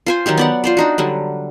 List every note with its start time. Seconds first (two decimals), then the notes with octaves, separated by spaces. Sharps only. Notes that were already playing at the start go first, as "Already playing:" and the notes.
0.06 F4 C5 G#5
0.26 D#3 F#3 D#4 G4
0.38 B3 D5 F#5
0.64 F4 C5 D5
0.77 D4 D#4 F#4
0.98 D3 F#3 G3